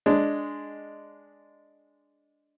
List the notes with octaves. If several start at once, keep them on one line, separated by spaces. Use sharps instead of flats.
G#3 D4